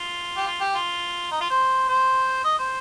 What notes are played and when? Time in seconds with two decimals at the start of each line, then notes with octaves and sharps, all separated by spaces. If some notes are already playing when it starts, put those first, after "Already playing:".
Already playing: F4
0.37 G4
0.46 F4
0.60 G4
0.75 F4
1.31 D#4
1.41 F4
1.50 C5
1.88 C5
2.44 D#5
2.59 C5